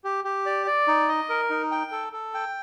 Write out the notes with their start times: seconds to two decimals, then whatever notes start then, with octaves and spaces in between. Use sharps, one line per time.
0.04 G4
0.25 G4
0.46 D5
0.67 D5
0.88 D#4
1.09 D#5
1.30 A#4
1.50 D#4
1.71 G5
1.92 A4
2.13 A4
2.34 G5